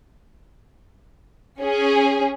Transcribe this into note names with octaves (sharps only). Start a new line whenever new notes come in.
C#4 G#4